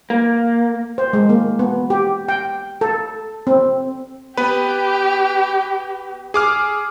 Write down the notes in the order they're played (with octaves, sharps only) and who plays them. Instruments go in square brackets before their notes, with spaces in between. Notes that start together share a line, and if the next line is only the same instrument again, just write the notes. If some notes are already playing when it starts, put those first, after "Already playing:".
[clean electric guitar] A#3
[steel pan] C5
G#3
A#3
B3
G4
G5
A4
C4
[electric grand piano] B3 B4 [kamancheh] G4
[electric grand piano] G#4 D6 F6